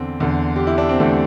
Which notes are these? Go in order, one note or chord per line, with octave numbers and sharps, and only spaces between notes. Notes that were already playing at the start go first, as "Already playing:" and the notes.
Already playing: E2 D3 C4
E2 D3
G4
E4
D4
C4
E2 D3 A3